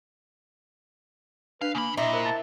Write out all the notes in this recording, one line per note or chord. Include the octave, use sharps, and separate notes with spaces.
D4 B4 F5
C#3 A#3 G#5 B5
A#2 E4 D#5
A#4 C5 B5
A5